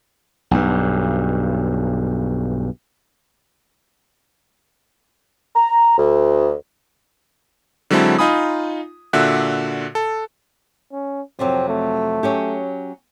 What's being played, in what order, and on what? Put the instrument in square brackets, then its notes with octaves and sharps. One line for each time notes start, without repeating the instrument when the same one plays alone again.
[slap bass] B1 G2
[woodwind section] A#5
D2
[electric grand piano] D3 F#3 G#3 C4 E4 A4
D#4 F4 G#5 B5 D#6
A#2 D3 F#4 E5 F#6
A4
[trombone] C#4
[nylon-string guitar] F2 C3 F#3 [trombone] C4
[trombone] A3
[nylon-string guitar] F#3 C#4 G4